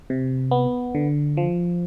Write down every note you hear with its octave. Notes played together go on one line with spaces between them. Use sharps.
C3
B3
D3
F3